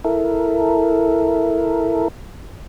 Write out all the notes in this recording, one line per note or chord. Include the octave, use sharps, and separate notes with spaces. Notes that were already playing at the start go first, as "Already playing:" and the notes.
E4 A4 A#4